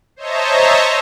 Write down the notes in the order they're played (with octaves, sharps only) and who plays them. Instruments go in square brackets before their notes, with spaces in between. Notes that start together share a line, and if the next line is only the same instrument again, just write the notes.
[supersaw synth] C5 C#5 D#5 E5 A5 A#5